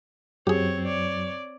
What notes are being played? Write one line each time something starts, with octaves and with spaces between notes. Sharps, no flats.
F#2 F#3 C4 G4 G#4 C#5
C#5 D5